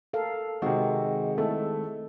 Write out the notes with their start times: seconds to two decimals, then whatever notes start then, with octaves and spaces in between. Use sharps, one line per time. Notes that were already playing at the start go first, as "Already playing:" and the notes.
0.13 A4 A#4 F5
0.62 C3 D#3 G#3 C4 F#4 G#4 D#5
1.38 A3 E4 A4